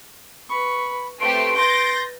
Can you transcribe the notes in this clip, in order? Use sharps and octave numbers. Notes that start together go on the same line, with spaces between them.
B4 B5 C#6
A3 C4 G4 B4 C6 D7
C6 G6 A6 A#6